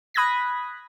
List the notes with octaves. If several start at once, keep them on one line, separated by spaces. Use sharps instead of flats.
B5 D#6 F#6 G#6 A#6 B6